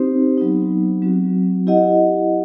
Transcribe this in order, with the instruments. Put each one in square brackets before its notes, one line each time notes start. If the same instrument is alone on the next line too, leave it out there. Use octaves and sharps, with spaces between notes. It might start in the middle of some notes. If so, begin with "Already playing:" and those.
Already playing: [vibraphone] C4 D#4 G4 C5
F#3 B3 D#4
F#3 C4 F#4
E4 G4 D#5 F#5